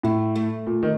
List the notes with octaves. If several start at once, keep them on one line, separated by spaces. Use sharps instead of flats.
A2 A3
A3
A#2
D#3